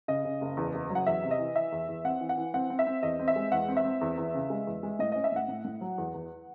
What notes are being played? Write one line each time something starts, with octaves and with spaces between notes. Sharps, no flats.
C#3 D#5
C#3
F#1
E2
F#1
F#3
F#5
E2 E5
C3
D#5
E3
E3 E5
E2
E2
C4 F#5
E3
F#5
E3
C4 F#5
C4
E5
C4
E2 D#5
C4
E5
G#3
E2 F#5
C4
E5
C4
E2
E2
C#3
G#3
E2
G#3
A2 D#5
C#4 D#5
E5
A2 F#5
A2
A2
F#3
E2
E2